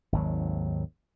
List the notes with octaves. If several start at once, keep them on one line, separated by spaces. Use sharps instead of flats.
G#1 D#2 F#3